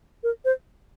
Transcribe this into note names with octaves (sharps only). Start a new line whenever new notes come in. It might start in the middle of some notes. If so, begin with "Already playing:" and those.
A#4
C5